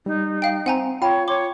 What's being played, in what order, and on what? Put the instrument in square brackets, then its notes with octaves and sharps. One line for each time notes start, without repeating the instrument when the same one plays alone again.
[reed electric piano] G3 [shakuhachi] D#4
[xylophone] F5 G5
[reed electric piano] C4 [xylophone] F#5 G#5 A#5
[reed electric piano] F4 [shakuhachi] C#5 [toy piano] G5 B5
[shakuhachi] C#5 [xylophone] C6 D6